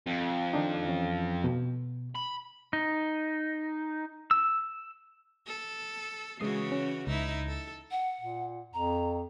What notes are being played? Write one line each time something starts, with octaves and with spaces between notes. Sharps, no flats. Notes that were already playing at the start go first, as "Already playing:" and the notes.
F2
D#3 D4 D#4
E3 C#4
B2
B5
D#4
E6
A4
C#3 E3 G#3 F#4 D#6 C7
C#4
C#2 D#4 E4
A4
F#5
A#2
F2 A#5